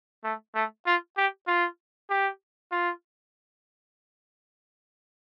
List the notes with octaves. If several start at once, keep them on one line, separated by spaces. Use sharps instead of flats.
A3
A3
F4
G4
F4
G4
F4